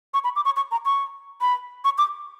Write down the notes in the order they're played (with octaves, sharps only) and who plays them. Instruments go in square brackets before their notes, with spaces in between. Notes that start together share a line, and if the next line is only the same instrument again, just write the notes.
[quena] C#6
B5
D6
C#6
C#6
A#5
C#6
B5
C#6
D6